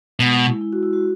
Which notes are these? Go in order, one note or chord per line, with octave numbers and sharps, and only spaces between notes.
B2 G#3
E4
E4
F#4
E4
F#4